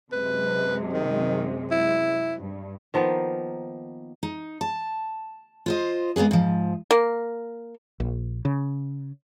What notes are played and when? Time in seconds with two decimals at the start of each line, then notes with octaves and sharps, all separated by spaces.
0.12 F#2 C3 G#3 B4
0.93 D#3
1.71 E4
2.40 G2
2.94 D#3 F3 A#3 B3
4.23 D#4
4.61 A5
5.66 F4 C5 D#5
6.16 G#3 A#3 B3 C#4 G#4
6.31 G#2 F3
6.91 A#3
8.00 A#1
8.45 C#3